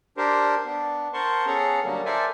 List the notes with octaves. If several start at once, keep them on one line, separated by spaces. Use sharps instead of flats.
D4 G4 A#4 C5
B3 D4
A#4 C5 F#5 A5 C6 C#6
B3 C#4 G#4 A4 F#5 A#5
D3 F#3 G3 A#3
A4 A#4 C5 D5 E5 G#5